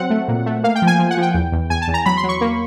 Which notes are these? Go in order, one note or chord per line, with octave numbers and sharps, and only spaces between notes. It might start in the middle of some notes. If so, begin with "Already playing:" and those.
Already playing: F#3 C4 F#5
A3
A#2
A3
A#3 F5
G5
F3
G#5
F3
F#5
F3 G5
E2
E2
E2 G#5
A5
E2
A#5
F#3 B5
C6
F#3
C#6
A#3